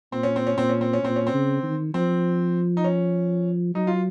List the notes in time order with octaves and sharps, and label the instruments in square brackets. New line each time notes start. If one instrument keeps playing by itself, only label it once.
[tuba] A#2 [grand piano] C4
[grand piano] C#4
C4
C#4
[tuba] A#2 [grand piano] C4
[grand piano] C#4
C4
C#4
[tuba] A#2 [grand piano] C4
[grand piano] C#4
C4
[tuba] C#3
D#3
[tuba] F3 [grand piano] C4
[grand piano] D#4
C#4
[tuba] F#3 [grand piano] D#4
[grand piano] F4